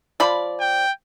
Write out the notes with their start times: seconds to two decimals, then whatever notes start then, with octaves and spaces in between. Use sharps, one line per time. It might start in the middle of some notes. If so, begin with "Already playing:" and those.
0.20 F3 D5 B5
0.60 G5